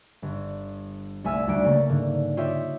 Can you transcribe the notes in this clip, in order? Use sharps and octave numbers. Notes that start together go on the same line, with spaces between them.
G1
C2 A3 E5 G#5 E6 F6
D2 G3 D4 C#7 D7
C#3 A3 A#3 A6
G#2 D3
F4 G4 C#5 D#5 E5 G5